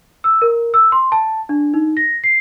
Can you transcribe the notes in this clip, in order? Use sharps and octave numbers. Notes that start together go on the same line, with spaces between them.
E6
A#4
E6
C6
A5
D4
D#4
A#6
C7